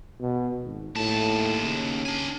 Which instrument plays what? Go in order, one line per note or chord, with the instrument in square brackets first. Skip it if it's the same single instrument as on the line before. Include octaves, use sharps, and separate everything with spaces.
[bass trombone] B2
G#1
[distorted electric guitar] D#2 A5 [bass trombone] A2
[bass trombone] C#3
[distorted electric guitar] D4 G#5